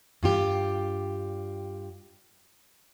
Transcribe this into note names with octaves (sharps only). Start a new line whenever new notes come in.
G2 F4 G4